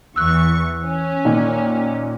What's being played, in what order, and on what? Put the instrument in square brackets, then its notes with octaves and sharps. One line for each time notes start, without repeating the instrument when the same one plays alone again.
[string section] E2 E3 C#6 [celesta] E6 F#6
[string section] C#4
[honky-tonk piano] A#2 D#3